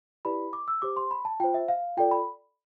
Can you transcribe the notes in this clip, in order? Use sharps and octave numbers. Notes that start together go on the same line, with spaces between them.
E4 G4 B4 D5 B5
D6
E6
G4 C5 D6
C6
B5
A5
F4 C5 G5
E5
F5
F4 A4 D5 G5
B5